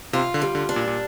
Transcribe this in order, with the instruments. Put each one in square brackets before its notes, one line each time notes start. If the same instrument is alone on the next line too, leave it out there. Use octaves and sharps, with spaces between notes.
[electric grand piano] C3 [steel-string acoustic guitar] F4
[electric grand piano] D3
[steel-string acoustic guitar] G3
[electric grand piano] D3
[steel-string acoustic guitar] D4
[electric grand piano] A#2
A#2